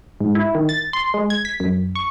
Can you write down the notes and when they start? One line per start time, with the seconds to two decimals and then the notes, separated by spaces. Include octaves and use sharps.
0.20 G#2
0.35 E4
0.55 D#3
0.69 A6
0.93 C6
1.14 G#3
1.30 G#6
1.45 B6
1.60 F#2
1.95 C#6